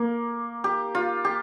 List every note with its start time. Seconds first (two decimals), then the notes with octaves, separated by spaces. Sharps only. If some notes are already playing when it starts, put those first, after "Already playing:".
Already playing: A#3
0.64 G4
0.95 F4
1.25 G4